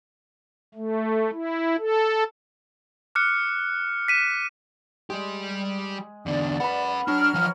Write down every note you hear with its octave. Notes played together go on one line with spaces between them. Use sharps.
A3
E4
A4
D6 F6 F#6 C#7
B6 D#7 E7
G3 G#3 G4
E2 D3 D5
C#4 B4 F#5 B5
F#3 D4 F6
E3 F3